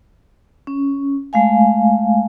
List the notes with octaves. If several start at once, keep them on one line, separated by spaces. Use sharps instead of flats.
C#4
G#3 A3 F5 G#5